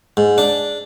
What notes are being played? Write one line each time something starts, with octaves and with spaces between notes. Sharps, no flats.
G#2
D4